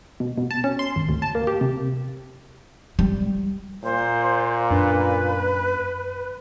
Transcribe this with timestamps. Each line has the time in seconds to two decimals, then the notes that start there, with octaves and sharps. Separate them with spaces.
0.20 B2
0.38 B2
0.51 A5
0.64 C#4
0.79 C6
0.96 G#1
1.09 D2
1.22 A5
1.35 A#3
1.47 G4
1.61 C3
2.99 G3
3.83 A#2 C5
4.70 F#2 D4 B4